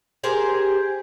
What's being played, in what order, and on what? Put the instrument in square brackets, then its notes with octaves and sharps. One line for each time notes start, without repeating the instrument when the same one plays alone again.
[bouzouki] G4 G#4 A#4 C5